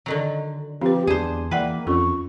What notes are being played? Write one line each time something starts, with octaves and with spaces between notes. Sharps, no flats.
D3 D#3 F#3
F3 C4 G4 B4
E2 D4 G#4 C5
E3 A#3 B4 D5 F#5 G5
F2 C#4 F4 A4 C#6